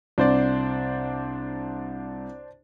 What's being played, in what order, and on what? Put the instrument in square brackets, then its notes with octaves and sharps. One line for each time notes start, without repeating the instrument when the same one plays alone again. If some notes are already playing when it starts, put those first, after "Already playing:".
[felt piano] C2 [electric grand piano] D4 C5 D5